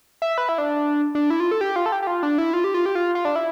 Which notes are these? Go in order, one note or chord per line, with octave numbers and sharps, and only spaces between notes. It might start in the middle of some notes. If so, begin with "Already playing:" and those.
E5
B4
E4
D4
D4
E4
F4
A4
G4
F4
A4
G4
G4
F4
D4
E4
F4
G4
F4
G4
F4
F4
D4
E4